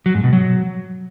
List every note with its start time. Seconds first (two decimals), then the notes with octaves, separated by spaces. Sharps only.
0.06 F#3
0.15 G#2
0.24 B2
0.33 F#3